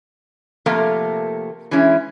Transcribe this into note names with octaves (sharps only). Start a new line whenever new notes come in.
C3 F3 A3 A#3 A#4 F5
E3 G#3 C#4 E4